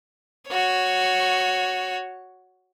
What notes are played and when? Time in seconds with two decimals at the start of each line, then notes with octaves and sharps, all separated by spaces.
0.49 F#4 C#5